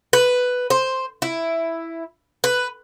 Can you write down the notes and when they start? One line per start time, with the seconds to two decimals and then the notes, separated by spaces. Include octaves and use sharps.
0.13 B4
0.70 C5
1.22 E4
2.44 B4